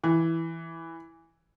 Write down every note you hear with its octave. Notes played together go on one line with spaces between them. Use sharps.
E3